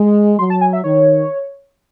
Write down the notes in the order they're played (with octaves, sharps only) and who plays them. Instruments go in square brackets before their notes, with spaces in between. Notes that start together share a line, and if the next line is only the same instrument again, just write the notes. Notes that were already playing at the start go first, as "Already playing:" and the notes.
Already playing: [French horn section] G#3
[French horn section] F#3 [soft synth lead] C6
[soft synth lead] A5
G#5
E5
[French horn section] D#3 [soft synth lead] C#5